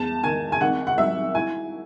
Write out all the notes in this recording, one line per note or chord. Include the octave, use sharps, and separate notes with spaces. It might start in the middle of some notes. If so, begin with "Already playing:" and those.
Already playing: E2 A5
D#3 G#5
G#5
G#1 F#5
F#5
F#3 E5
E4 G#5